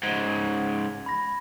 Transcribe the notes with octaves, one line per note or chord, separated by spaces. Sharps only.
G#2 C#3 G#6 G7
B5 A#6